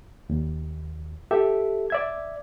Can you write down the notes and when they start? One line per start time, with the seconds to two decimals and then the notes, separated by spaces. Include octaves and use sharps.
0.30 D#2
1.31 G4 A4 E5
1.90 D5 E5 G#6